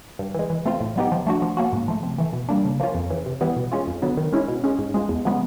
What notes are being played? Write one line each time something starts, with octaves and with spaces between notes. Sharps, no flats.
G2
E3 G#3
E3
A3 C4 F4
A2
F#3 B3 D#4 G4
F3
A3 D4 F#4
F3
A#3 C#4 F#4
G#2
F3 A3
C3
E3 A3
B2
G3 A#3 D4
C#3
F3 A#3 C#4 F4
F2
C#3 E3
C3
E3 G3 B3 E4
B2
G#3 C#4 F4
F2
D3 F#3 B3
D#3
G#3 C#4 E4
B2
G#3 C#4
G#2
F3 G#3
E2
C#3 F3 G#3 B3